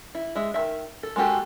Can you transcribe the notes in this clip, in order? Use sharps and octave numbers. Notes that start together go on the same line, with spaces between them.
E4
G#3 E5
D#3 F3 E5
A4
G#3 A#3 F#4 G4 A4